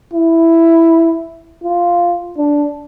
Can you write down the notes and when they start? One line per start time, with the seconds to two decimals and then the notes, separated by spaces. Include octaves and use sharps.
0.13 E4
1.64 F4
2.38 D4